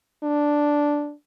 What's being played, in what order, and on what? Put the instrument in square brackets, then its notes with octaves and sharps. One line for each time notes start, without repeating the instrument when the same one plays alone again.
[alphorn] D4